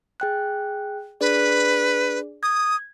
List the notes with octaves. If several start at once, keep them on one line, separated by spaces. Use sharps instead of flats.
G#4 G5 F#6
D4 G#4 B4 D5
D#6 G#6